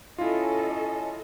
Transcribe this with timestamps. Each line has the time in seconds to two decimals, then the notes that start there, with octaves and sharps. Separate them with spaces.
0.18 C#4 E4 F4 A4 D#5